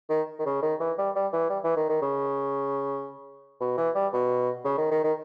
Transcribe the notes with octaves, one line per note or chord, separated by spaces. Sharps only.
D#3
D#3
C#3
D#3
E3
G3
G3
E3
G3
E3
D#3
D#3
C#3
B2
E3
G3
B2
C#3
D#3
D#3
D#3